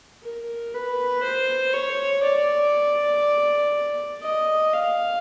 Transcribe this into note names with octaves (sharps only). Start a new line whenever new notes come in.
A#4
B4
C5
C#5
D5
D#5
F5